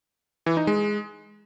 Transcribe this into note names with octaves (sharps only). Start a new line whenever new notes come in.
E3
D#4
G#3